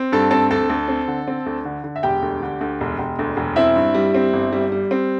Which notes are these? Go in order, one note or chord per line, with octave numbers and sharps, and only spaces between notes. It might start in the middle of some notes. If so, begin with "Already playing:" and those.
Already playing: C4
G2 A4 A5
C4 A4 A5
D2 A4 A5
D2
C4
D3
C4
D2
D3
D3
E5
E1 G4 G5
D2
D3
D2
E1
E1
D2
E1
C4 E4 E5
G2
G3
C4
G1
G3
G3
C4